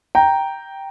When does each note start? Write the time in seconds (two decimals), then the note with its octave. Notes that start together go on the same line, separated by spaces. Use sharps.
0.15 G5 A#5